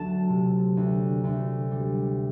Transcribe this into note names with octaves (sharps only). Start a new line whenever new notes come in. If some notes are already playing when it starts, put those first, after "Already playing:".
Already playing: D2 F#3 A3 A5
C3
D2
D2
G3